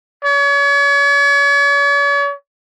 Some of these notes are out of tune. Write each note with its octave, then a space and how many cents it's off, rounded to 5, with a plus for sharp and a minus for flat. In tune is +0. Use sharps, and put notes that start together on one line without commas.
C#5 +40